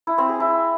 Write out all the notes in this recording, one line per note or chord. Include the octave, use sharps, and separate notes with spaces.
E4
C4
G#4
E4